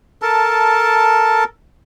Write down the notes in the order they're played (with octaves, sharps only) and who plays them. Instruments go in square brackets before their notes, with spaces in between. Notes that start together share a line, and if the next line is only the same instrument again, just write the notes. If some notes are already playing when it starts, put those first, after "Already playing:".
[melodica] A4 A#4 A5